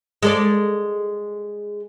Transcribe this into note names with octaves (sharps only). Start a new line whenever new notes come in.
G#3 A4 D5